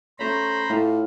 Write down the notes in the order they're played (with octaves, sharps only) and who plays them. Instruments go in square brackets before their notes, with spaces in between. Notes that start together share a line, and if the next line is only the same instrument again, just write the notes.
[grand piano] A3 C#4 [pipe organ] C5 A#5 B5
[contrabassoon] A2 [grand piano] F4 A4